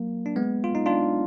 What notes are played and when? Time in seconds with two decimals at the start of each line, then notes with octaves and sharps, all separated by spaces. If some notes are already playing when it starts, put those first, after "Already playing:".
Already playing: F#3 A#3
0.26 D4
0.36 G#3 B3
0.64 F4
0.75 D#4
0.86 D4 F4